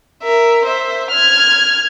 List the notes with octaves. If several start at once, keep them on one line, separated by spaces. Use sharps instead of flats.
A#4 E5
C5 E5
F6 G#6